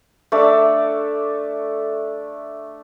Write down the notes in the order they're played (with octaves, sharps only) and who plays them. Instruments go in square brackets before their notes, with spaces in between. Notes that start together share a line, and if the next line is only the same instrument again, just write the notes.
[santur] A3 D4 E5 D6